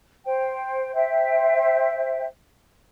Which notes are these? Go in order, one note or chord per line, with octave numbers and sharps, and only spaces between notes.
C5 G5
C5 E5 G5